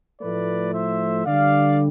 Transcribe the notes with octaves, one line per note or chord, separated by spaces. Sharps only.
A2 F3 A3 B4 D5
C5 E5
D3 G3 D5 F5